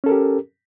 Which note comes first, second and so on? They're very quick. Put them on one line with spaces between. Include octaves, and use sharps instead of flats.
C#4 A4 A#4 G4